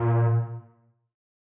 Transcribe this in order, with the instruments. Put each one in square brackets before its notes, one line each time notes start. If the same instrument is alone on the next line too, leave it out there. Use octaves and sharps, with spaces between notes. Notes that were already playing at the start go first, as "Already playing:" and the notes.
Already playing: [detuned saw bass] A#2